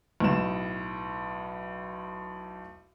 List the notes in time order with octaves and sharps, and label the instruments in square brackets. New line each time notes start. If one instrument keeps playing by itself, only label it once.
[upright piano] B1 A2 E7